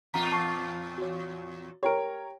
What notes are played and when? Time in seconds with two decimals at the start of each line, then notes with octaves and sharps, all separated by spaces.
0.14 E2 A#2 F4 A#5 B6
0.32 A5 C#6 C7
0.98 F#4 C#5
1.83 G4 A#4 C#5 G5 D7